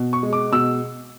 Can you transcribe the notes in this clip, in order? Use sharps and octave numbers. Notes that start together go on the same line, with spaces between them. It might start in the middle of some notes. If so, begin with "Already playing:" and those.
Already playing: B2
C#6
G#3
D6
B2 E6